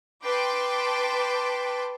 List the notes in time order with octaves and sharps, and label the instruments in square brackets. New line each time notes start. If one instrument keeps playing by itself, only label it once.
[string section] B4 G5 A5 C6 D6